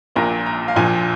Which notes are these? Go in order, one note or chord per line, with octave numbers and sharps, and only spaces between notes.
A#1 A#2 A#3 A#5
A#5
F5
A#1 A#2 F3 G#5